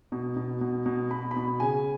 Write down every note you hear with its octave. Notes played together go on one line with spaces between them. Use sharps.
B2
B2
B2
B2
B2 B5
B5
B2
C#3 G#5